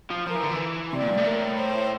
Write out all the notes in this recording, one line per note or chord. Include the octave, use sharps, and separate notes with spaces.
F3
F3 A#4
E3
D3
E3
C3 D5
A#2
G2
A2
A#4
C5